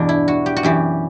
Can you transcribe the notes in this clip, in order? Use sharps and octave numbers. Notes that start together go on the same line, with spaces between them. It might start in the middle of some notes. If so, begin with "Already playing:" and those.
Already playing: E2 G2 B2 D4
E4
F#4
G4
F#4
F#2 E3 G4